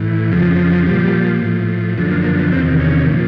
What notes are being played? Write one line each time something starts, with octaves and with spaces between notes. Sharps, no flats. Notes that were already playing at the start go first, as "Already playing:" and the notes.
Already playing: A2 E3
F2 C#3 F3
A#2 F3 G3
A2 F3
F#2 D3 F3 A3
A#3
A#3
B3
E2 C3 D#3 C4
C#4
A#2 F3